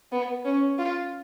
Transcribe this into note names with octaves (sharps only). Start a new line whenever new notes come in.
B3
C#4
F4